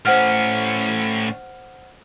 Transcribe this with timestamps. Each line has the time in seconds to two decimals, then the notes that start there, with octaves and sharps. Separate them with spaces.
0.05 A2 C#4 C5 F#5 F6